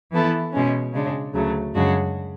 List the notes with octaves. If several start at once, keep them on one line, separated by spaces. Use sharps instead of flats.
E3 B3 E4 A4
B2 G#3 C#4
C#3 G#3 D4
D2 C#3 F#3 A3
F#2 C#3 G#3 D4 F#4